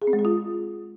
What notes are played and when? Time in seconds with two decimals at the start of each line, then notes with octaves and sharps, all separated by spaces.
0.02 G#4
0.07 C4
0.13 G#3
0.19 G#4
0.25 F4